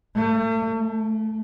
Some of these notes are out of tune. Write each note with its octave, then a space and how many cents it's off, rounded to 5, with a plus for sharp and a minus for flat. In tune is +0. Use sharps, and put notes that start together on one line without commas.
A3 +40
A3 -15